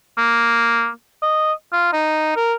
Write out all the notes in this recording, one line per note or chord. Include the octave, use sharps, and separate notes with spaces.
A#3
D#5
F4
D#4
A#4